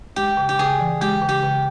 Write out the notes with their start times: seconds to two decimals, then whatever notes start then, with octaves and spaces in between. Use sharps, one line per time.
0.16 G#3 G4
0.37 C#3
0.49 G4
0.59 C#3 G#4
0.80 E3
1.01 G#3 G4
1.22 C#3
1.29 G4
1.43 C#3